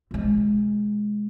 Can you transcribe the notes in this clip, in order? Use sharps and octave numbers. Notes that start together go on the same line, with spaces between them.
B2 G#3